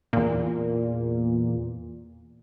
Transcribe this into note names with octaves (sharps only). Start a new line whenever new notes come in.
E2 A#2